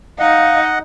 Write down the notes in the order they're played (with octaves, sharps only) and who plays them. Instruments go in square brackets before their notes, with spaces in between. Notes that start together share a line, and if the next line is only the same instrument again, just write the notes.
[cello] D#4 [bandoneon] D#5 F#5 [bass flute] F5